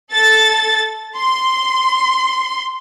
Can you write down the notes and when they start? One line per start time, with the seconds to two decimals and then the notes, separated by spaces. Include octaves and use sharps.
0.11 A4 A6
1.16 C6